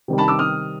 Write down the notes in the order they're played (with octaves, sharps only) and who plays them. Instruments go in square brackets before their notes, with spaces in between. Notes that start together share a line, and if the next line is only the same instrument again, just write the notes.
[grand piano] C3 D#3 G3
[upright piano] A5 B5
D6 E6
D#6 F6